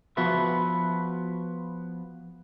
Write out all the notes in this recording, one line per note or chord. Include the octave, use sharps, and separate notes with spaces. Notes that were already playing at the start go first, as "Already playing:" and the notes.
F3 B3 F#4 B4 E5